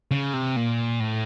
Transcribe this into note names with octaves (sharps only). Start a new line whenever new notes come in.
C#3
C3
A#2
A2